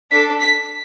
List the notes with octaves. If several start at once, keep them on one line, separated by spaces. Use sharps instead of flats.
D4 A4 B6
B6